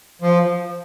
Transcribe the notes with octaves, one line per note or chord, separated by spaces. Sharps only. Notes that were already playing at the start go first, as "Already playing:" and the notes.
F3